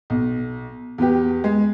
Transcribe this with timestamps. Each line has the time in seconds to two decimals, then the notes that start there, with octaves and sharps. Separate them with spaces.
0.10 B1
0.98 E2 B3 G4
1.44 G#3